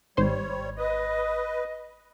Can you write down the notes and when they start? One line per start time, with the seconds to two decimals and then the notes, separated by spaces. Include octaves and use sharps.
0.17 G#1 G3 C5 C#5 C6
0.78 B4 D#5